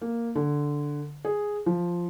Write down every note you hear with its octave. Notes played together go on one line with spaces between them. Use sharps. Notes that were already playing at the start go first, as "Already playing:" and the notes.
A#3
D3
G#4
F3